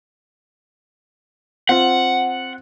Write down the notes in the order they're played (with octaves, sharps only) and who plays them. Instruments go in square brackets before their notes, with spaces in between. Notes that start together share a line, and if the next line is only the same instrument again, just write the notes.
[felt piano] C4 F4 [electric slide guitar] F#5